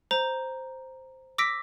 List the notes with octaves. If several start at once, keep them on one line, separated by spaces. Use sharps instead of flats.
C5 A#5
D6 E6 A#6 B6 D7